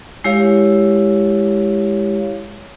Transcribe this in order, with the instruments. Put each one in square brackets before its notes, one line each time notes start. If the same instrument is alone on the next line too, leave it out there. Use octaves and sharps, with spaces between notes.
[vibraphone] G#3 E4 G4 C#5 F5